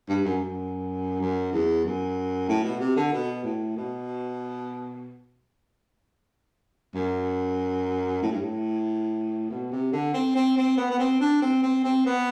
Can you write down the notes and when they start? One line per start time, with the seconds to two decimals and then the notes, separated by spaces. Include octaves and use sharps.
0.09 G2
0.25 F#2
0.41 F#2
1.20 F#2
1.53 E2
1.85 F#2
2.49 A2
2.64 B2
2.80 C3
2.97 D3
3.12 B2
3.44 A2
3.76 B2
6.95 F#2
8.23 A2
8.32 G2
8.42 A2
9.50 B2
9.72 C3
9.93 D3
10.14 C4
10.35 C4
10.57 C4
10.77 B3
10.90 B3
10.99 C4
11.21 D4
11.42 C4
11.63 C4
11.84 C4
12.06 B3